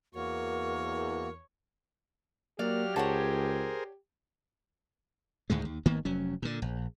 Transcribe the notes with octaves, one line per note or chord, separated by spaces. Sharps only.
E2 A#3 F#4 A#4 C#5
F#3 A#3 G4 D5 F5 F6
C#2 G#4 A#4 C5 C#5 F#5 A5
D2 A2 D#3 G#3
D#2
G#1 D#3 A#3 B3
F1 F#3 C#4
A#2 D3
A#1